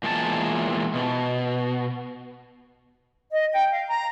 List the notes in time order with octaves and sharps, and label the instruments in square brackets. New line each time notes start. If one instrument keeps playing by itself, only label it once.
[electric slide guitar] E2 A#2 G#3 D4 A5
B2
[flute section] D#5
G5
F5
A#5